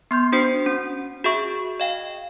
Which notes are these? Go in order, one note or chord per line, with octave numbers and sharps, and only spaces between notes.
B3 C6 G6
D4 F#4 C5 C6 C7
C#4
F#4 G#4 E5 C#6
D#5 F5 G5